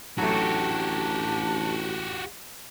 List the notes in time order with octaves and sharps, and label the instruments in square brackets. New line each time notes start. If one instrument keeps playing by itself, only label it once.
[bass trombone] A1 [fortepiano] F#3 A3 [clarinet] D4 [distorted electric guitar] F#4 G4